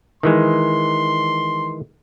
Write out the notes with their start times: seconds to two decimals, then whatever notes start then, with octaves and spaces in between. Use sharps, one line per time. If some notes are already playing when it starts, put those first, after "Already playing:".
0.23 D#3 E3 G#3 C6